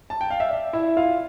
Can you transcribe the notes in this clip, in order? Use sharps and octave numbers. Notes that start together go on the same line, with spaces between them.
A5
G5
F5
E5
D5
E4 E5
F4 F5